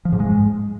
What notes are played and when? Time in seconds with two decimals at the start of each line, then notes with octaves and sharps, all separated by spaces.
0.05 F3
0.12 G#2
0.19 G#3